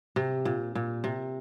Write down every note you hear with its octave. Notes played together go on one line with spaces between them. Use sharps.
C3
A#2
A#2
C3